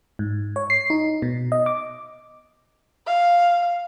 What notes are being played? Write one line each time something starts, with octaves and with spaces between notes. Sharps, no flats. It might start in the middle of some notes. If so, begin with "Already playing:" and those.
G#2
C#5
C7
D#4
B2
D#5
D6
F5